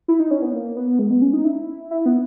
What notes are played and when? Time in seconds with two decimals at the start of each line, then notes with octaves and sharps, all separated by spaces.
0.08 E4
0.20 D#4
0.31 C#4
0.42 B3
0.53 A#3
0.77 B3
0.99 G#3
1.10 B3
1.22 C#4
1.33 D#4
1.44 E4
1.91 E4
2.06 B3